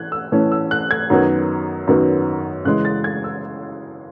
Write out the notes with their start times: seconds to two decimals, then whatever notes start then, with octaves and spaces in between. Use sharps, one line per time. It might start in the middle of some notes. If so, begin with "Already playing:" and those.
Already playing: E3 F#6 G#6
0.12 E6
0.32 A2 E3 A3 C#4
0.52 E6
0.71 F#6
0.91 G#6
1.10 F#2 D#3 F#3 B3
1.87 F#2 D#3 F#3 B3
2.65 C#3 E3 G#3 C#4 F#6
2.85 A6
3.04 G#6
3.24 E6